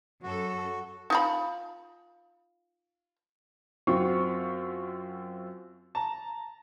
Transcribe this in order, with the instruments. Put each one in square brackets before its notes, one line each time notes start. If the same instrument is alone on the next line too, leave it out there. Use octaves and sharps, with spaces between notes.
[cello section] F#2 A4 [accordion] F#4
[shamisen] D#4 F4 B5
[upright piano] F#2 C4 F4 F#4 C#6
A5 A#5